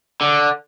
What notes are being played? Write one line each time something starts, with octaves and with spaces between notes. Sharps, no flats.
D3